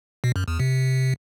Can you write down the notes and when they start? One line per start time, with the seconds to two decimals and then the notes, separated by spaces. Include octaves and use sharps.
0.24 B2
0.36 F#2
0.48 E2
0.59 C3